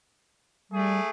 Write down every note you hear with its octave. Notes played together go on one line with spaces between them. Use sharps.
G3 A3 G#4